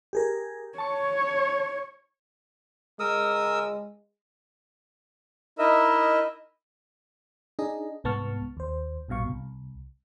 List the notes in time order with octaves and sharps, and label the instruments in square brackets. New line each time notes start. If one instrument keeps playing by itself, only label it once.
[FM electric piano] G4 G#4 A#4
[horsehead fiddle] C#5 [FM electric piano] A5 C#6
[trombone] G#3 [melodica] A#4 D#6 E6
[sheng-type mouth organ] D#4 E4 A#4 D#5 E5 E6
[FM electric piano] D4 D#4 G#4 D#5
C2 G#2 B3 A5 C#6 F6
D#2 C5
A#1 G2 B2 F5 C#6
C2